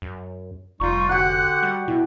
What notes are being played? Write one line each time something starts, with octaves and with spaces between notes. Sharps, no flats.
F#2
F1 G3 D#4 F4 C#6
D3 F#4 G4 F#5 F#6
G3
B2 E4